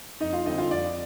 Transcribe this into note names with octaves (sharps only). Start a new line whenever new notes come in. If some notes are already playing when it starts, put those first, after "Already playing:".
F2 D#4 D#5
F4 F5
D3 G3 C4 D#4 D#5
F4 F5
F2 D5